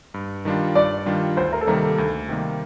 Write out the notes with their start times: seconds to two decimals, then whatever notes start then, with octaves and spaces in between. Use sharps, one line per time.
0.14 G2
0.45 D#3 G3 D4 F4
0.75 G2 D5
1.06 D#3 G3 D4 F4
1.37 D2 C5
1.52 A#4
1.61 A4
1.67 C3 D#3 G3 A#3 A#4
1.83 A4
1.98 D2
2.28 C3 D#3 G3 A#3